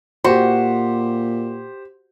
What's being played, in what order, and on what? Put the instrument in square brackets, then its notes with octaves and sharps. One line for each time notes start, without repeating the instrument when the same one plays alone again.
[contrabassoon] A#2 [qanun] F#4 [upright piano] G4 C5